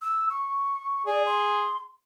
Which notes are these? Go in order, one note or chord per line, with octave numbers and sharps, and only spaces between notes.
E6
C#6
G#4 D5
C6